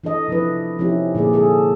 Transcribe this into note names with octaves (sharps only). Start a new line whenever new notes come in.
E3 D4 A4 D#5
C3 F3 D4 E4 B4
C3 F3 C#4 D#4 E4 G4
A#2 D3 A#3 G#4 D5
G#4 A4